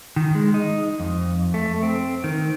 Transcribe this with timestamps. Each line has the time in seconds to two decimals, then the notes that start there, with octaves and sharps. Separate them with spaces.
0.16 D#3
0.35 G#3
0.54 D#4
1.00 F2
1.54 A3
1.83 C4
2.24 D#3